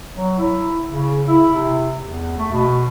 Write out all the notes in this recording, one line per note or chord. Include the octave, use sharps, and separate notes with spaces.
F#3
E4
C#3
E4
C3
E2
A3
B2